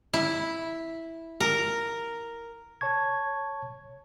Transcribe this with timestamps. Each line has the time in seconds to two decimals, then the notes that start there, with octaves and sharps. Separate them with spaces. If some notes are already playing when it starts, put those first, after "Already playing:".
0.14 E4
1.40 A#4
2.81 C#5 A5 C#6 G#6